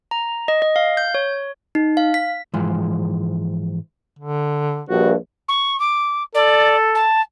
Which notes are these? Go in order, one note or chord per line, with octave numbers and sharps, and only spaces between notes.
A#5
D#5
D#5
F5
G6
C#5
D#4
F5
B6
G#2 E3 F3 G#3
D3
A#1 G2 F#4
C#6
D6
A4 D5
A5